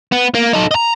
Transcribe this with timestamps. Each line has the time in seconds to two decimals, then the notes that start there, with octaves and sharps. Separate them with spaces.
0.12 B3
0.35 A#3
0.53 D#4 A4
0.71 D#5 A#5